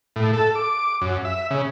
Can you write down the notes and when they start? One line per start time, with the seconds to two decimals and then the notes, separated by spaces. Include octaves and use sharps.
0.16 A2
0.33 A4
0.55 D6
1.01 F#2
1.25 E5
1.51 C#3